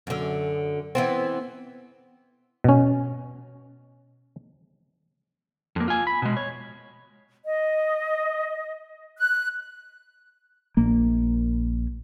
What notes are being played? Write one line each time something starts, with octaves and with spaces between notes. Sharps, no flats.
F#2 D3
E3 B3 C4
B2 C#4
F2 A#3
F4 G#5
B5
B2 G#3
C#5
D#5
F#6
A#1 A#3